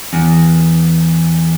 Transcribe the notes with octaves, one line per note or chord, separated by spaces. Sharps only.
E2